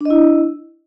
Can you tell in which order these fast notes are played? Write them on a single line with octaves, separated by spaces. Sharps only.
D4 D#5 E4